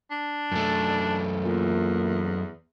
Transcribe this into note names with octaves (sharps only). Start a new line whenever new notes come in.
D4
F#2 A3
E2 A#2